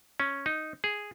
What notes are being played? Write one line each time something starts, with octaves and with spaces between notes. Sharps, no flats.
C#4
D#4
G#4